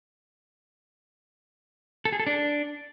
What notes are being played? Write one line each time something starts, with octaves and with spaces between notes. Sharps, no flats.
A4
G#4
A4
D4